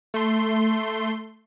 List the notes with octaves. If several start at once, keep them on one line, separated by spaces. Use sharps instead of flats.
A3 C6